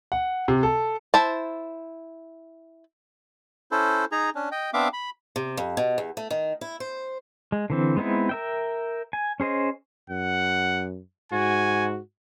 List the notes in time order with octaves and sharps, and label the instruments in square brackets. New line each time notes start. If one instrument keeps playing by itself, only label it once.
[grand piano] F#5
C3
A4
[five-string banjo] E4 C5 A5
[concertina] C#4 E4 A4 C5
D#4 G#4 A#5
C#4 D4
D#5 G5
B3 C4 D4 E5 F5 D6
B5
[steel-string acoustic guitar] C3
F2
B2
E2
A3
D#3
E4
C5
[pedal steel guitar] G#3
D3 E3 C4
G#3 B3 C4 D#4 E4
A#4 E5 G5
G#5
C#4 G#4 C5 D#5
[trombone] F#2 [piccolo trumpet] F#5
[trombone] G#2 [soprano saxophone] F#4 [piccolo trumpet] G#5